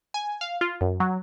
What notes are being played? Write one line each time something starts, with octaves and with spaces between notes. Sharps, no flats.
G#5
F5
F4
F#2
F#3